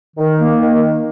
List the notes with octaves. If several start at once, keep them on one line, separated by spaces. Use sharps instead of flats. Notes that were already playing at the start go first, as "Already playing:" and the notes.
D#3
A#3
D#3